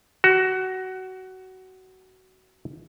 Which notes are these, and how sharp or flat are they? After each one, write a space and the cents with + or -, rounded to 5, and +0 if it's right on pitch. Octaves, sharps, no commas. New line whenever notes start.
F#4 +20